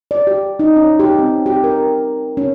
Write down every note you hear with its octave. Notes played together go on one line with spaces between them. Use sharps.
D5
G4
D#4
C#4
G4
C4
G4
A#4
C#4